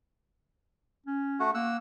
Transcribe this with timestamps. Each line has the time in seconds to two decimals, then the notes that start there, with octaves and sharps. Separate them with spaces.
1.06 C#4
1.40 A3 F#4
1.54 A#3 F#5 E6